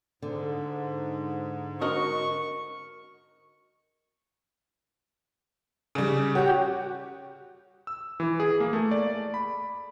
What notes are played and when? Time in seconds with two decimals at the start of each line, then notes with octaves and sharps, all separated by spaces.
0.22 G#2 D3
1.81 F#4 A#4 D#5 C#6
5.95 C#3 G3
6.35 F#4 G4 C#5
7.87 E6
8.20 E3
8.40 G#4
8.60 A#3
8.73 A3
8.91 D5
9.34 B5